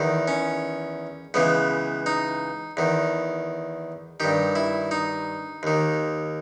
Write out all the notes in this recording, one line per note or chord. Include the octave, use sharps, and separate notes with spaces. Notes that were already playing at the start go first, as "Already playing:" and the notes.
Already playing: E2 D#3
C#4
C#2 C#3 E3 B3
D#4
E2 D#3
G2 D#3 G4
E4
D#4
D#2 D#3